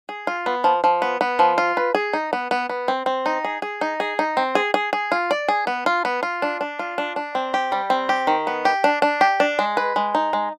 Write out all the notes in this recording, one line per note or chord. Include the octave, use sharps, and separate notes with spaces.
G#4
F4
B3
F3
F3
B3
B3
F3
F4
B4
G#4
D#4
B3
B3
B3
C4
C4
D#4
G#4
G#4
D#4
G#4
D#4
C4
G#4
G#4
G#4
F4
D5
G#4
B3
F4
B3
F4
D4
D4
F4
D4
D4
C4
G4
G3
C4
G4
D#3
B3
G4
D4
D4
G4
D4
G#3
B4
G#3
D#4
G#3